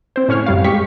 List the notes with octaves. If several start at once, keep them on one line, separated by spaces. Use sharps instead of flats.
C4 C5
A2 C#4 C#5 F6
F#2 G3 F5
G#3 G4 C#6 B6